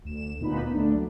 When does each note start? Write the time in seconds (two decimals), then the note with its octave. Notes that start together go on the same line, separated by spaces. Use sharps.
0.05 D2 E7
0.40 D2 A#2 B3 D#4 B4 B5
0.73 D2 A3 D4
0.94 F#3